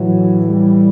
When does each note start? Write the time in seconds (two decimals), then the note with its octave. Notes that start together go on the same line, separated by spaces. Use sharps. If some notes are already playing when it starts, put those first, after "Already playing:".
Already playing: A2 E3 F#3
0.47 G3